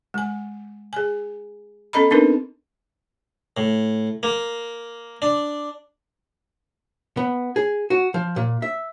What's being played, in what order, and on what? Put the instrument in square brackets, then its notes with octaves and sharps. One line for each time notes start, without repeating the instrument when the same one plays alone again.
[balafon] G#3 G#5
G#4 G#5
B3 C#4 A4 D#5 A#5 B5
B3 C4 D4 D#4 A#4 B4
[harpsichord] A2
A#3
D4
[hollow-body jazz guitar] B3
G#4
F#4
F3
A#2
E5